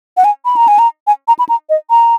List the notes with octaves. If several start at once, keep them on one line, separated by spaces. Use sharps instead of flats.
F#5
G#5
B5
A#5
G#5
A#5
G#5
A#5
B5
A#5
D#5
A#5